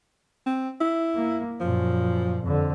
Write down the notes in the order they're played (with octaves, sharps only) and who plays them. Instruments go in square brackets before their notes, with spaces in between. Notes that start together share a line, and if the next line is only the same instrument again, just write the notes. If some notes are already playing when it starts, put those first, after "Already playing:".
[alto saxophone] C4
E4
[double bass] A#3
[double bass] F#2 A#2 [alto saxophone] F3
[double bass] F2 D3